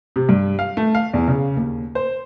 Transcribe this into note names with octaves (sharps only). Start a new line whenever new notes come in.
C3
G2
F5
A3
F5
E2
C#3
D#2
C5